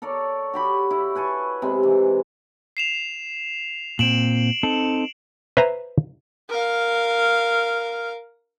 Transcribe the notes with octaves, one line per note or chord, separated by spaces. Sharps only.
A4 A#4 C#5 D5
F#4 G4 B5
E4
B4 G#5 A5 C#6
C3 G#3
E3
C7 E7 F7
A#2 C4 D7 E7 F#7
C4 D#4 A4
B4 C5 E5 G#5 A#5
A#4 F5